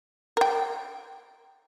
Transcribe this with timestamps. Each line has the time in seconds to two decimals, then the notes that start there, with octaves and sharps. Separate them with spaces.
0.37 A#4 G5